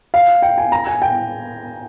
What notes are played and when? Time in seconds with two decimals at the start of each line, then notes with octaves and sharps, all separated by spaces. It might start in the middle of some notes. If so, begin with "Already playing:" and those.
0.14 F5
0.42 G5
0.58 G#5
0.72 A#5
0.87 G#5
1.02 G5